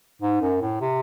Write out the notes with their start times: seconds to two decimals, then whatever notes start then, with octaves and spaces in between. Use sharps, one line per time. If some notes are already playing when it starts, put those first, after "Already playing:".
0.22 G#2
0.42 F#2
0.62 A2
0.81 C3